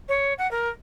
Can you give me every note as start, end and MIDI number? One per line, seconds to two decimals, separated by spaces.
0.09 0.34 73
0.38 0.49 78
0.51 0.69 70